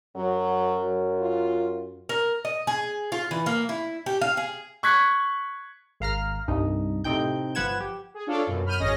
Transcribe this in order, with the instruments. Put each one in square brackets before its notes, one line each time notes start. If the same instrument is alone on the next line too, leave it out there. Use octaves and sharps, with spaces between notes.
[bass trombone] F#2 [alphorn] F#3
[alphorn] F4
[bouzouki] A#4
D#5
G#4
F4
E3
A#3
E4
G4
F5
G#4
[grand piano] C#6 F#6 G#6 B6
[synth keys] G#1 F5 A#5 F6
C2 G2 D#4
A2 C3 C4 D#4 G5 G6
G1 F3 B4 F#5 G#6 E7
G4
[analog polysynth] G#4
D4 F4 A4 C#5 D5 F5
F#2 B2
F#2 B5 F6 G6 D#7
G#1 C#4 G#4 D#5 A#6